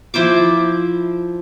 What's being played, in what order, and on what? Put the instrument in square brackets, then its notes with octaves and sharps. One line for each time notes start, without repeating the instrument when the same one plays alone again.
[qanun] F3 E4 C5 D6